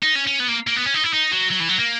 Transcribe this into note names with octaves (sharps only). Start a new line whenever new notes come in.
D#4
C#4
C#4
B3
A#3
A#3
B3
C#4
D#4
E4
D#4
F#3
F#3
E3
F#3
A#3